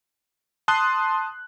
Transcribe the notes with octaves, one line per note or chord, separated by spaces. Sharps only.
A5 C6 D#6 F#6